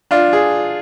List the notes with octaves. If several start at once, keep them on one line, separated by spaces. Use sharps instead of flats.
D4 F4
G#4